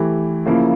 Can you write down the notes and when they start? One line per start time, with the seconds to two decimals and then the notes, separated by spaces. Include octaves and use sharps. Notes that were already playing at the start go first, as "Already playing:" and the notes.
Already playing: E3 A3 E4 G4
0.46 C#3 F3 A#3 E4